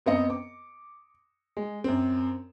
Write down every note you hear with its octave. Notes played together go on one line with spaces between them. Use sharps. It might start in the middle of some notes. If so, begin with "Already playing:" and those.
F#2 B3 C4 D#5 C#7
D6
G#3
F#2 C4